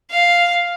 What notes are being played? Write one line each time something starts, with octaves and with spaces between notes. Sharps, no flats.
F5